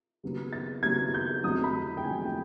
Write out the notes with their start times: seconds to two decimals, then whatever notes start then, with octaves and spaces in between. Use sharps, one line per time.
0.23 D#2 C#3 F#3 B3
0.53 A6
0.83 D#2 C#3 F#3 B3 G#6
1.14 G6
1.43 F1 F2 D3 F#3 D#6
1.64 B5
1.97 G5
2.04 F1 F2 D3 F#3 G#5
2.25 G5